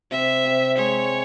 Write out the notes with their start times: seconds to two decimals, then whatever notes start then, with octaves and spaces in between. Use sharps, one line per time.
0.11 C3 E5
0.45 C3
0.77 G#3 C#5